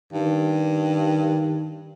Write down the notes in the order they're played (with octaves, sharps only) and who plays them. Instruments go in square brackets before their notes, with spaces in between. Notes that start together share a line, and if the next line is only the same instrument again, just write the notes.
[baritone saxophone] G2 [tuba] D#3